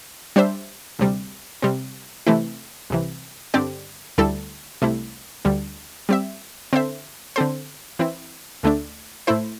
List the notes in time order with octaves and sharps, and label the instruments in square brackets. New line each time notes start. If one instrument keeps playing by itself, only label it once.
[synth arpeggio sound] G3 D4 C5 E5
D2 C3 G3
C3 G3 C4
C3 E3 A3 C4 E4
C2 C3 E3
G2 D3 C4 G4 D5
D2 D3 G3 E4 A4
C2 C3 A3 E4
D2 D3 G3
G3 C4 G4 E5
D3 C4 A4 C5 E5
D3 C4 A4 C5
E3 C4 E4
D2 D3 A3 D4
A2 A3 E4 C5